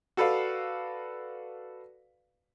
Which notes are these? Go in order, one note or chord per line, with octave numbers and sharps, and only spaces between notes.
F#4 A4 B4 D5 F5